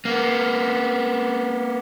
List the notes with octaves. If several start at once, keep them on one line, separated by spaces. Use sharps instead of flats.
A#3 B3